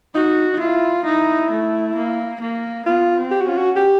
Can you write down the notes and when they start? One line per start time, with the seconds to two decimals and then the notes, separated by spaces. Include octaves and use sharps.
0.14 D#4 F#4
0.53 D#4
0.60 E4 F4
1.05 D#4 E4
1.51 A3
1.96 A#3
2.41 A#3
2.86 B3 F4
3.17 C4
3.31 G4
3.41 F#4
3.46 C#4 F4
3.58 F#4
3.76 G4